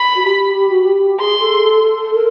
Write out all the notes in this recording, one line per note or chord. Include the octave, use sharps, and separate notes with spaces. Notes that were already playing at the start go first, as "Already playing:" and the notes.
Already playing: B5
F#4
G4
G4
F#4
G4
G#4 C6
A4
A4
A4
A#4